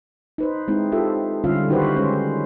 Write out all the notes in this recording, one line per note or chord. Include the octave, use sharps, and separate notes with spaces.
D#4 B4 C5
G#3 C4 D#4 E4
F4 G4 A4 E5
D3 G3 C#4 F4 E5 F5
D#3 D#4 F#4 G4 B4 C5
G#3 C#4 C5